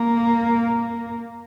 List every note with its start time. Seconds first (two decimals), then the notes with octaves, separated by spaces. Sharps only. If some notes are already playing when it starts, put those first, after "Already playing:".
Already playing: A#3